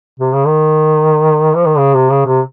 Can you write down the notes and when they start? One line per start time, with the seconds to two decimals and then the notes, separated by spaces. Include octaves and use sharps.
0.20 C3
0.33 C#3
0.47 D#3
1.56 F3
1.66 D#3
1.77 C#3
1.94 C3
2.10 C#3
2.26 C3